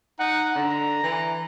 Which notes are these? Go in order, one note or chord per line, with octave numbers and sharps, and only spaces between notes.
D#4 F#5
D3 A#5
E3